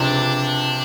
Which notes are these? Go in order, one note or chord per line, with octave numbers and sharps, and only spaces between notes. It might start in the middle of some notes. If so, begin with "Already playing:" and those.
Already playing: C#2 C3 F3 D4